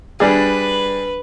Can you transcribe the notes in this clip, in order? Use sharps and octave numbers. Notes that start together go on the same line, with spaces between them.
G3 D4 G#4 B4